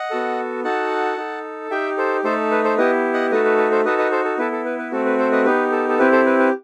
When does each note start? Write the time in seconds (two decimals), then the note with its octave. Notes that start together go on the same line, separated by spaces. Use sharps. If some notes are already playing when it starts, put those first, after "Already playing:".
Already playing: D#5 F#5
0.11 B3 F#4 A4
0.64 D#4 F#4 A4 F#5 A5
1.17 D#4 A4
1.71 D#4 G4 E5 G5
1.98 A4 C5
2.24 A3 D#4 A4 C5
2.51 B4
2.64 A4 C5
2.78 B3 E4 G4 B4 D#5
3.14 D#5 F#5
3.31 A3 D#4 F#4 A4 B4 D#5
3.45 B4
3.58 B4
3.71 A4 C5
3.85 D#4 F#4 A4 B4 D#5
3.98 B4 D#5
4.11 A4 C5
4.24 A4
4.38 B3 E4 A4 B4
4.52 A4
4.65 B4
4.78 B4
4.91 A3 C4 F#4 A4
5.05 B4
5.18 A4 C5
5.32 B4 D#5
5.45 B3 D#4 G4 B4
5.72 A4
5.89 A4
5.99 C4 E4 G4 B4
6.12 A4 C5
6.26 B4
6.39 B4